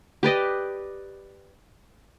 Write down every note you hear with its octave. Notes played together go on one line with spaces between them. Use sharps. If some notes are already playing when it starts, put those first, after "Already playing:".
G4 B4 D5 D#5